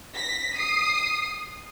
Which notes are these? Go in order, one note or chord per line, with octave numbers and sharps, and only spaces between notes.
A#6 B6
D#6 C7